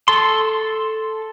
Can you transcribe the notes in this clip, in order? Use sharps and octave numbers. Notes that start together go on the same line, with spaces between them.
A4 C6